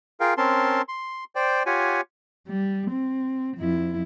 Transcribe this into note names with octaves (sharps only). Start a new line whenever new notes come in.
F4 G#4 A#4 F5 G5
C4 C#4 A#4 A5 C6
C6
C5 D5 G5
F4 G4 C#5 F#5 G#5
G3
C4
F2 E4